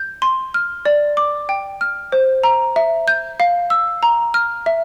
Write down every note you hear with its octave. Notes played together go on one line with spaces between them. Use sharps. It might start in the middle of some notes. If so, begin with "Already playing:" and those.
Already playing: G6
C6
F6
D5
D6
G5
F6
C5
A#5
E5
G6
F5
E6
A#5
F6
E5